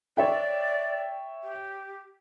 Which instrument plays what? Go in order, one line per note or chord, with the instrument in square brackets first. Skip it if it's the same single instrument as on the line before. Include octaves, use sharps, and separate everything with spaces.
[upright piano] C#5 E5 G5 [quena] D5
[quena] G4